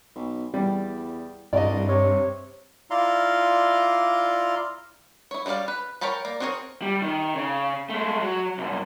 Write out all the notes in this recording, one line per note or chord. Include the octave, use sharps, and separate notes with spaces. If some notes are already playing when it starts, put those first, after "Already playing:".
B1
E2 G3
C2 G2 D5 D#5
C3 C#5
E4 F4 D5 F5 A#5 C6
E4 C#5
F#3 G3 A4 D5 F5
B4
A#4 C#5 G5 A5 B5
A#3 D5
C4 D4 G#4 A#4 C#5
G3
D#3
C#3
G#3 A3
F#3
C2 F#2